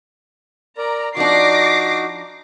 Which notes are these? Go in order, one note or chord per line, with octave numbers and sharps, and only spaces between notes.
A#4 D5 A#5
F3 D4 D#4 F#4 D6 A#6 C7